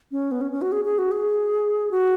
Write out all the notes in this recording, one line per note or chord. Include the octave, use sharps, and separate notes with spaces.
C#4
B3
C#4
C#4
F#4
G#4
G#4
F#4
G#4
F#4